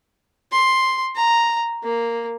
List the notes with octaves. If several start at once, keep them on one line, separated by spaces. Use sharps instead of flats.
C6
A#5
A#3